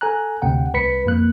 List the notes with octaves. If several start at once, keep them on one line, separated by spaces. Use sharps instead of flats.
A4 G#5 A#5 F#6
D2 C3 F#5 G5
C2 B4 B5 B6 C#7
F2 A#3 F#6